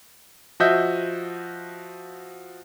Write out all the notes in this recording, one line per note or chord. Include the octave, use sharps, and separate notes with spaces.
F3 F#4 D#5 E5 G6